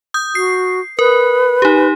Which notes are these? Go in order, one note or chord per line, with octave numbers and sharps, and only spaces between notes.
D#6 G6
F#4 C7
A#4 B4
D#4 G4